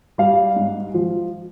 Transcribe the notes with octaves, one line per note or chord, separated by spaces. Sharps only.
G3 F5
G#2
F3